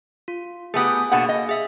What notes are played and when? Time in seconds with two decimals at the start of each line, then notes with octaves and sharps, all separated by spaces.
0.28 F4
0.74 A3 B3 G4 G#4 G#5 D#6
1.12 B2 A#3 D4 G#4 F#5
1.29 D#5
1.49 G#4 E5